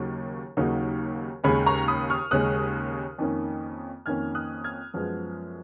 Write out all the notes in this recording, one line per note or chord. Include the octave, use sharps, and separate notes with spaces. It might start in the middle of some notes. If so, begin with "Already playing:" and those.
Already playing: D#2 C#3 F#3 A#3 D#4
D#2 C#3 F#3 A#3 D#4
D#2 C#3 G#3 C#4 G#5 B5
A#5 C#6
B5 D#6
C#6 F6
D#2 C#3 G#3 C#4 D#6 F#6
F2 D#3 A#3 C#4
F2 D#3 A#3 C#4 F6 G#6
D#6 F#6
F6 G#6
F#2 F3 G#3 B3